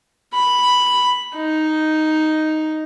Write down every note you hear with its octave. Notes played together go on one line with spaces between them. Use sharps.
B5
D#4